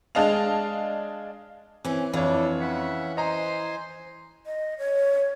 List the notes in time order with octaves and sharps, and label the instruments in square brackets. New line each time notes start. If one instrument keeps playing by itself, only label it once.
[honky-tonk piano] G#3 D4 D#5 F5 A5 F7
[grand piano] E3 [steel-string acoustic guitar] C4 C#4
[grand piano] F2 C#5 [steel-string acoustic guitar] E3 [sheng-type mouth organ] D4 E4 A4
[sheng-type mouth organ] C#4 E5 F#5
[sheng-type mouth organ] C5 G#5 C6 [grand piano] D#5 A#5
[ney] D#5
C#5